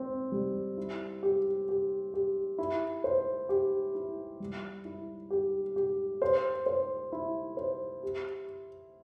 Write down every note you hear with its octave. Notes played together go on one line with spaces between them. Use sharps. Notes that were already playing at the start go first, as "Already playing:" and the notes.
Already playing: C4
G3
E4
G4
G4
G4
E4
C5
G4
E4
G3
E4
G4
G4
C5
C5
E4
C5
G4